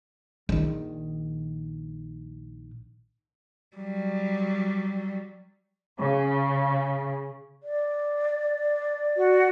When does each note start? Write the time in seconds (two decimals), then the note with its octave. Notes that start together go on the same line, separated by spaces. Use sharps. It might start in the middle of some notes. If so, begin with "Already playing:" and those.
0.49 A#1 D#3
3.76 F#3 G3
5.99 C#3
7.63 D5
9.17 F#4